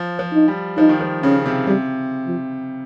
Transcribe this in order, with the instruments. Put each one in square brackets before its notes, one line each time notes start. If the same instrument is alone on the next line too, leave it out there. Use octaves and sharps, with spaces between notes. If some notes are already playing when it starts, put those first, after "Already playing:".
Already playing: [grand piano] F3
F3
[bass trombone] D#4
[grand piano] G3
[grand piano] F3 [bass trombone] D#4
[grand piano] D#3
F3
[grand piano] C#3 [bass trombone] C#4
[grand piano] C3
[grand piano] C3 [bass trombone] G3
[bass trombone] F3